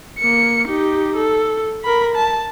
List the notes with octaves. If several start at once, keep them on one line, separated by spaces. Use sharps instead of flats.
A#3 C#7
D#4 G4
A4
A#4 B5
A5